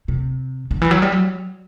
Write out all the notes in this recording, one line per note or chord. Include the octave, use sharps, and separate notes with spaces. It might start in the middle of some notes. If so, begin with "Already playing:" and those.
C3
D3
E3
F#3
G3
F#3